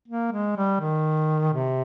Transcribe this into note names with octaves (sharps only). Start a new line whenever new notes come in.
A#3
G#3
G3
D#3
C3